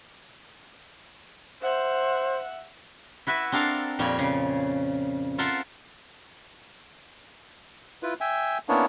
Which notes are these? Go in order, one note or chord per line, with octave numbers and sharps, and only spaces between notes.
C5 E5 F#5
E4 F#4 B4 E5
C4 D4 A4 A#4 F5
F2 A#2 G3 C#5
C#3
F4 A4 A#4 C5 E5 F#5
E4 F4 B4
E5 G5 G#5
A#3 B3 C#4 D4 E4 C#5